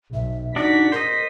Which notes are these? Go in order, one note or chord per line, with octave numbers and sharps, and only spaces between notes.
B1 E5
D4 D#4 F#4 D5 B6
A#4 C5 D#5